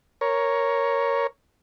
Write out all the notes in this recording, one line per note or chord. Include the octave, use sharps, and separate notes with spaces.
A#4 C#5